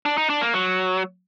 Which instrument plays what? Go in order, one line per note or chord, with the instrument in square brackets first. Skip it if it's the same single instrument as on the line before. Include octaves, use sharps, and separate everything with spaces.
[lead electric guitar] D4
D#4
D4
A#3
F#3